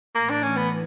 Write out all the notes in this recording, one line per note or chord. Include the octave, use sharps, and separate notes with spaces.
A2 E3 A3 A#3
D4
C#4
B3